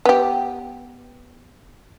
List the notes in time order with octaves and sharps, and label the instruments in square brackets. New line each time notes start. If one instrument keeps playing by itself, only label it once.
[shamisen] B3 G4